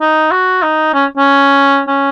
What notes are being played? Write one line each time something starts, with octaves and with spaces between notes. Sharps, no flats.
D#4
F#4
D#4
C#4
C#4
C#4